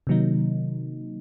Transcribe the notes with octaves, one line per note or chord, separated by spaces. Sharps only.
C3 D#3 F#3 A#3 D#4